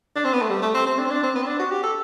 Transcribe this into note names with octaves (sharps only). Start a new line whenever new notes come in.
D4
C4
B3
A3
G3
A3
C4
C4
D4
C4
D4
C4
B3
C4
D4
F#4
G4
A4